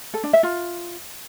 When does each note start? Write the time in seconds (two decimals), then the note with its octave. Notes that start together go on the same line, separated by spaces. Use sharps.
0.14 A4
0.24 D4
0.33 E5
0.43 F4